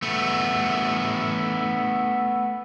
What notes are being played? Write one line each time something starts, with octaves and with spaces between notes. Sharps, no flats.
A3 B3